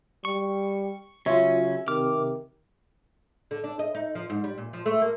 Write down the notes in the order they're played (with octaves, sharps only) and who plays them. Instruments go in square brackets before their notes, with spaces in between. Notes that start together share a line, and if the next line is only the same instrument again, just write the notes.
[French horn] G3 [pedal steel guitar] C#6
[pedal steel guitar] C#3 C#4 [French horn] F#3 [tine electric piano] F4 C#5 [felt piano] E5
[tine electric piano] C3 [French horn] D#3 [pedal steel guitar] D6 F6
[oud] D3
D4
D#5
D#4
F3
G#2
G3
A#2
F3
A3
A#3